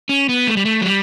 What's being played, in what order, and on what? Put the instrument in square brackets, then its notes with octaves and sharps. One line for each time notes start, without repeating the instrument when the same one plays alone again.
[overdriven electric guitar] C#4
B3
A3
G3
A3
F#3
G3